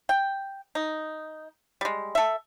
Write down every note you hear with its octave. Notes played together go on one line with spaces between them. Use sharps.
G5
D#4
G3 G#3
A4 E5